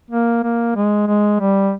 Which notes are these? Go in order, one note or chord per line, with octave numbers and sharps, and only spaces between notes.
A#3
A#3
G#3
G#3
G3